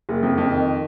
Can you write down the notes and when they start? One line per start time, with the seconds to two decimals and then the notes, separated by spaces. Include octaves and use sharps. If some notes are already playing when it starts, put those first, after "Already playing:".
0.09 F#1
0.23 F2
0.38 F2
0.52 D#3